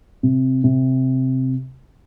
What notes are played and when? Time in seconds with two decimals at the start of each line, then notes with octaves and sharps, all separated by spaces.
0.23 C3
0.64 C3